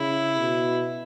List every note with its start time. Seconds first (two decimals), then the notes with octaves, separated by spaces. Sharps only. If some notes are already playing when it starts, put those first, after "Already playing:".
Already playing: C#3 E4
0.38 B2